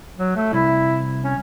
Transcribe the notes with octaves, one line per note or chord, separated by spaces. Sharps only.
F#3
A3
C2 E4
C#4